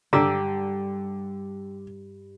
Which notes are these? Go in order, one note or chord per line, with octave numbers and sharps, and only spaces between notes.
G2 D3 G4 A#5 D6 E6